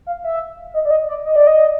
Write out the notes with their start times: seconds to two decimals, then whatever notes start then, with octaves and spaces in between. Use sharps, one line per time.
0.07 F5
0.24 E5
0.74 D#5
0.85 D5
0.91 D#5
1.08 D5
1.25 D#5
1.36 D5
1.47 D#5